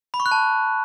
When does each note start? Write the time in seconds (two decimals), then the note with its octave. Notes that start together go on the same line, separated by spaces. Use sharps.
0.14 B5
0.20 C#6
0.26 F#6
0.32 A5